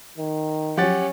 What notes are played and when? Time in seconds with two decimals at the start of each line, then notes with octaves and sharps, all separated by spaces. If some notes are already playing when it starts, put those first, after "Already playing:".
0.18 D#3
0.77 F3 F#3 C#4 G4 F#5 A6